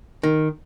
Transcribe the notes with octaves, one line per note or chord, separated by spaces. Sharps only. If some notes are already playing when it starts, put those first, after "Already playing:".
D#3